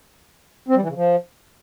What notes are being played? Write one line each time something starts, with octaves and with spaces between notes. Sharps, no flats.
C4
G3
E3
C#3
F3